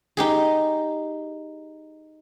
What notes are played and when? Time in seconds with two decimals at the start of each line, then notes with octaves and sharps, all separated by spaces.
0.17 D#4 G4 G#4